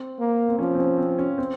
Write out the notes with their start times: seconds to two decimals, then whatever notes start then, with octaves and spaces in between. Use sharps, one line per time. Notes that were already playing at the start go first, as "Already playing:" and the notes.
Already playing: C4
0.20 A#3
0.49 C4
0.59 F3 C#4
0.75 C4
0.80 C#4
0.98 C4
1.19 C#4
1.38 C4